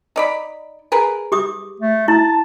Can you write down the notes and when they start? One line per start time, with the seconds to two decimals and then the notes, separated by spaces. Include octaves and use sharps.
0.16 D#4 D5 B5
0.92 G#4 A#4 B4
1.32 G4 D6 D#6
1.80 A3
2.08 E4 A5